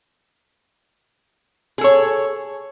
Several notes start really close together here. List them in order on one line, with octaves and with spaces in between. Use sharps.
G#4 A4 C#5